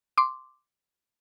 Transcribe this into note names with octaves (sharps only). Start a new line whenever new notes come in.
C6 D6